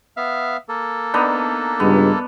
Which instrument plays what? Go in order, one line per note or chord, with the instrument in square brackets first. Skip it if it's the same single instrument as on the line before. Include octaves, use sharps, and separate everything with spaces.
[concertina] B3 E5 F5
A#3 A4
[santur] B3 D4 D#4
[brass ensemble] C#2 G2 G#3 [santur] B3